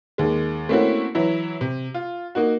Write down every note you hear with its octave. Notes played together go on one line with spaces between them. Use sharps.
D#2 G#3
A3 A#3 C4 C#4 E4 F#4
E3 F#3 E4
C3
F4
A#3 D#4 F#4